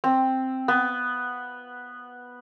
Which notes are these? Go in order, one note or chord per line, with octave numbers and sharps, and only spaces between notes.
C4
B3